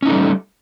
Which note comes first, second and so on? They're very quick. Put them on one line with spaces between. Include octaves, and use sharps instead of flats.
C#4 D#4 A3 G3